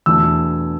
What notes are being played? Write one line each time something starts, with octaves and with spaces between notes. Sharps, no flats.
E2 B2 A3 D4 E6